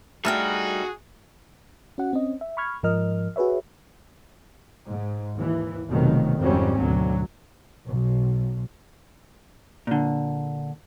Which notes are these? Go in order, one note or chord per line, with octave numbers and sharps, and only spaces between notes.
G3 A3 D4 D#4 F#4 G#4 G5 F6
C#4 F#4 F#5
C4 C#4 D#5
E5
B5 C#6 F6 G#6
G#2 F3 A#4 D#5 F6
F#4 G#4 B4 C#5 E5
G#2
D#2 E3
F1 B2 D#3 F#3
G#1 F2 F#3 G3 C4 C#4
D2 B2 F#3
B1
A#2 D3